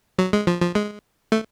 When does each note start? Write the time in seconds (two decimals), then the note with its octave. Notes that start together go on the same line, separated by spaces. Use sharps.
0.19 F#3
0.33 G#3
0.47 F3
0.61 F3
0.75 G#3
1.32 A3